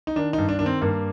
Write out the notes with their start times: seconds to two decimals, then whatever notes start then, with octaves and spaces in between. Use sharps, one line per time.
0.07 D#4
0.16 D#3 D4
0.33 D#4
0.38 G2
0.49 D4
0.59 D#3 D4
0.66 C4
0.81 G2 A#3